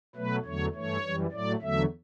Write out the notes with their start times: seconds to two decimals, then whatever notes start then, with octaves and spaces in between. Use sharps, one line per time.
0.15 B2 F#3 A3 B4
0.45 E2 D3 F#3 A3 C#5
0.74 G2 E3 A3 C#5
1.03 F#2 E3 G3
1.32 A2 F#3 A3 D5
1.61 E2 D3 F#3 A3 E5